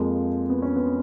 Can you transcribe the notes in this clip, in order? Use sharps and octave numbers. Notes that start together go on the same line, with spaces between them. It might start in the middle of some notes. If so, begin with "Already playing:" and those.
Already playing: F2 F3 G#3 A#3
B3
C#4
B3